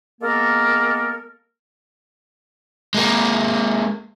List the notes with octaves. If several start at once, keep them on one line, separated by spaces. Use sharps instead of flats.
G#3 A#3 B3 A4 A#4
G#3 A#3